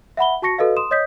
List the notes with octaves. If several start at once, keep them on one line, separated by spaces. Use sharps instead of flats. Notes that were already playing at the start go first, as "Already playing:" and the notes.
E5 F#5 B5 G7
F#4 A5 C#6 A#6 C#7
F#4 A4 B4 D#5 F5
C6 D#6 E7
C#5 D#5 D#6 G6 B6